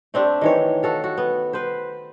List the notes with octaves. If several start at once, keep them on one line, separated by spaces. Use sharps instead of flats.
A3 C4 D4 G4
D#3 E3 C#5
F#4 A4 F5
F#4
B3
B4 C5